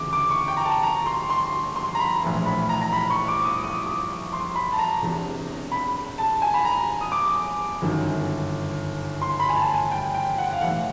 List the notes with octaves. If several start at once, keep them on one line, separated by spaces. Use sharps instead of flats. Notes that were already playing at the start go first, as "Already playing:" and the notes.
Already playing: D2 C#3 E3 D6
D6
C#6
G5
A#5
A5
A#5
C6
C6
C6
A#5
B5
A#1 A2 E3
B5
A#5
A#5
B5
C#6
D6
D#6
D#6
D6
C6
B5
A5
A#5
E1 E2 C3
B5
A5
G#5
B5
A#5
D#6
D6
G1 F#2 D#3
C6
B5
G#5
A5
G#5
G5
G5
F#5
F5
B1 A2 E3 F#5